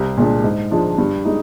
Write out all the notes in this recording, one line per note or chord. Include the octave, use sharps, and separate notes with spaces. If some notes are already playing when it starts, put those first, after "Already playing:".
Already playing: C2
A#2 G#3 D4
G#2
F3 G#3 D4
G2
G#3 D#4